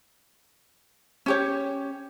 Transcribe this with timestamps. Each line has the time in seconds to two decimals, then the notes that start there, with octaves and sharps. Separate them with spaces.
1.26 C#4 G4 C#5